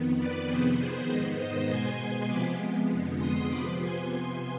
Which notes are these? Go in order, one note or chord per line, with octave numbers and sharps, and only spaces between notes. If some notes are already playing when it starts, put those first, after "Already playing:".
Already playing: F2 D#3 B3
B4 D5
F2 C3 D#3 B3 G#4 C5
G#4 C5
G#2 D#3 B3 C5 D#5
C5 D#5
B2 G#3 B3 G#5 C6
C3 F3 G#3 B3 B5 D6
F2 D3 G#3 B3
C6 D#6
C3 F3 B3 B5 D6
G#5 C6